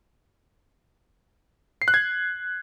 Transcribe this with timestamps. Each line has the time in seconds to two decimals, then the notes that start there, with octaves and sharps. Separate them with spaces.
1.82 C7
1.88 F#6
1.94 G#6